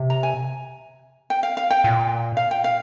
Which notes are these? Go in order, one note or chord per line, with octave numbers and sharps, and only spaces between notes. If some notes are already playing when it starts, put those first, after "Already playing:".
Already playing: C3
A#5
G#5
G5
F5
F5
G5
A#2
F5
G5
F5